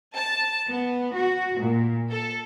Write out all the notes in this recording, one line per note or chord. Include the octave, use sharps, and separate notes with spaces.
A5
B3
F#4
A#2
A4